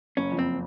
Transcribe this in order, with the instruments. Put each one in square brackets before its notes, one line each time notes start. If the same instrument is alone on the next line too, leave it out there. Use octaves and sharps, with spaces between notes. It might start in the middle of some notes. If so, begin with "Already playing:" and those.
[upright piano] F#1 [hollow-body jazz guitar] C#4
[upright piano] F2
[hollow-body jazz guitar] C4